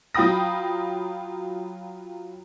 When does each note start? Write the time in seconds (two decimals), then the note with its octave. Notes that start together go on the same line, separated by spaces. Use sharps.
0.15 F#3 F4 G5 B5 D#6 A#6